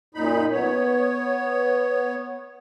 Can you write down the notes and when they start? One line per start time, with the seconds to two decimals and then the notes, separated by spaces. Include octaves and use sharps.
0.15 F#2 A#2 D#4 B5
0.52 B3 C#5